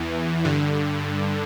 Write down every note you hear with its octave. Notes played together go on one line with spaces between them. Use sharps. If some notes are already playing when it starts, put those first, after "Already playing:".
Already playing: E2 E3
G2 D3